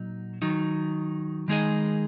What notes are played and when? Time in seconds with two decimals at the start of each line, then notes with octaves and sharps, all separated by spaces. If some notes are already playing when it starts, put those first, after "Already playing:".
Already playing: A#2 F#3 D#4
0.42 D#3 F#3 D#4
1.48 D#3 G#3 D#4 G#4 D#5